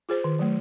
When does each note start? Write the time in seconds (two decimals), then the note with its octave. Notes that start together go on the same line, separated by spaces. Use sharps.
0.09 F4 G#4 C5
0.24 D#3
0.39 F#3 A3